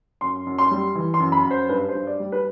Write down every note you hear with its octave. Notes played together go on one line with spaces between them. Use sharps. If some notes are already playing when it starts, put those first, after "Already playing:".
F#2 C6
F#2
C6
G3
E3
C6
F#2
B5
F#2
C5
G2 B4
C5
G2
D5
G3
B4